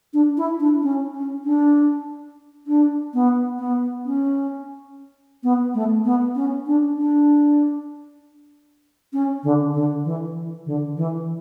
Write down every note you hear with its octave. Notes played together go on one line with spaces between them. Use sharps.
D4
E4
D4
C#4
C#4
D4
D4
B3
B3
C#4
B3
A3
B3
C#4
D4
D4
C#4
D3
D3
E3
E3
D3
E3